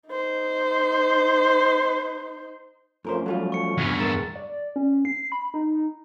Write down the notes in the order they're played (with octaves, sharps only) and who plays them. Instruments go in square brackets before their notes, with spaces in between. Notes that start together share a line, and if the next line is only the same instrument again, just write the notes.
[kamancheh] D#4 C5
[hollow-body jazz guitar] F2 A#4 C5 [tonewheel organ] F3 A3 C#4
[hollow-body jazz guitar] F#3 G3 F4
[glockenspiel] C#6 C#7
[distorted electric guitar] E2 G2 [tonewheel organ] G#5 B5 F6
[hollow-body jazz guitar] G#3 A#4 [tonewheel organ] E6 [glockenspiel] A6
[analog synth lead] D5
C#4
C7
B5
D#4